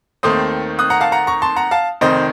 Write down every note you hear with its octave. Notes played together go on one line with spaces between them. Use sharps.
D#2 D#3 A3 C4 C6 D#6
D#6 F#6
F#5 A#5
F5 A5
F#5 A#5
A#5 C#6
A5 C6
F#5 A#5
F5 A5
F1 F2 D#3 C5 D#5